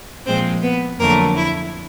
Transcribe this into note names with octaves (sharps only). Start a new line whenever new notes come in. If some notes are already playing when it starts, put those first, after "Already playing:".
A#2 F3 G#3 C4 C5
B3 B4
F2 D3 F#3 A3 A#3 A#4
E4